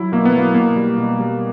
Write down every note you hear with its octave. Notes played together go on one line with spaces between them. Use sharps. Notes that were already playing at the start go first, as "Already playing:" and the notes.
Already playing: F#3 E4
B2 A#3
B3
F#3
A#3
B2 A#3
G3
B2
G3